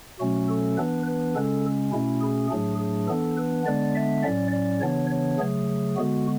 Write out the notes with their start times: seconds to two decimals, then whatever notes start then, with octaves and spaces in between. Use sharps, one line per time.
0.20 B2 F#3 A3 C#4 F#4
0.48 A4
0.78 E3 B3 D4 B4
1.07 B4
1.35 C#3 G#3 C#4 A4
1.93 B2 A3 C#4 E4
2.21 G#4
2.51 A2 F#3 A3 D4 G#4
2.79 G#4
3.08 E3 B3 D4 A4
3.37 B4
3.66 D3 G#3 B3 D4 D5
3.95 E5
4.23 A2 F#3 C#4 D5
4.52 D5
4.81 C#3 E3 B3 D4 C#5
5.10 C#5
5.39 C#3 F#3 A3 G#4
5.97 D3 G#3 B3 F#4